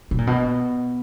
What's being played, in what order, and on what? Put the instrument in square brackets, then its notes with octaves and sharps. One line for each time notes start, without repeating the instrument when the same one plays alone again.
[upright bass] B2
A#2
B2